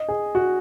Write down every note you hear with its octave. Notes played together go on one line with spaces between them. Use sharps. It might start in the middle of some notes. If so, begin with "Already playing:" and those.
Already playing: D#5
G#4
F#4